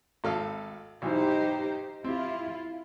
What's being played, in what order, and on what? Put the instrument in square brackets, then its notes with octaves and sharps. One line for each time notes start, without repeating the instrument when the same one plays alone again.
[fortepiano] G#1 A4 F5
[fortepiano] B1 E3 [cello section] D#4 G4 C5
[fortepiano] C4 G4 [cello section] E4 F4